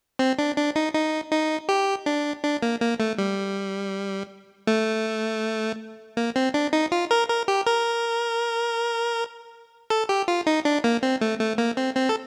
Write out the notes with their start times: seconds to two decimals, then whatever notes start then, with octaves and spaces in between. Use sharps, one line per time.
0.19 C4
0.39 D4
0.57 D4
0.76 D#4
0.94 D#4
1.31 D#4
1.69 G4
2.06 D4
2.44 D4
2.62 A#3
2.81 A#3
3.00 A3
3.18 G3
4.67 A3
6.17 A#3
6.36 C4
6.54 D4
6.73 D#4
6.92 F4
7.11 A#4
7.29 A#4
7.48 G4
7.67 A#4
9.90 A4
10.09 G4
10.28 F4
10.47 D#4
10.65 D4
10.84 A#3
11.03 C4
11.21 A3
11.40 A3
11.58 A#3
11.77 C4
11.96 C4
12.09 A4